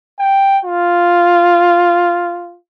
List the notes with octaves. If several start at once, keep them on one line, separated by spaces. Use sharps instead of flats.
G5
F4